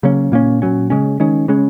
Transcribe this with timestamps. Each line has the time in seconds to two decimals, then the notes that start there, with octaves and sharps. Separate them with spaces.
0.03 C#3 F#3 A#3 C#4
0.32 A#2 A#3 C#4
0.62 A#2 F#3 C#4
0.90 C#3 G#3 C#4
1.20 D#3 G#3 C#4
1.48 C#3 G#3 C#4